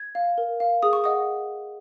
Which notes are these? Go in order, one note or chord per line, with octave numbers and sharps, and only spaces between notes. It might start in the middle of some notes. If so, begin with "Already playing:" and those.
Already playing: G#6
F5
A#4
F5
G#4 D#6
C#6
D#5 F#5 D#6